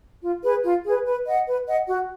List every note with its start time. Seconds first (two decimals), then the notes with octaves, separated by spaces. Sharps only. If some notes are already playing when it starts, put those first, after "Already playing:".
0.23 F4
0.43 G#4 B4
0.63 F4
0.84 G#4 B4
1.04 B4
1.25 D#5 F#5
1.45 B4
1.65 D#5 F#5
1.87 F#4